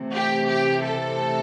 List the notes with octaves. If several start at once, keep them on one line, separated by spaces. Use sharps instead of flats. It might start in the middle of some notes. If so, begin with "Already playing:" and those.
Already playing: C3 E3 A3
G4
G4
A4